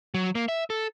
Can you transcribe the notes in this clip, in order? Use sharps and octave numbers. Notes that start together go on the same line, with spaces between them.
F#3
A#3
E5
A4